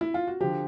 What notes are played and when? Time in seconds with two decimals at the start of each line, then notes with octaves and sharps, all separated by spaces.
0.01 E4
0.14 F4
0.27 F#4
0.40 D3 F3 G4